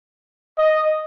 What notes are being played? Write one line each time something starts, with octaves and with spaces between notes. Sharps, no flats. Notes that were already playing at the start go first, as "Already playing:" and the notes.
D#5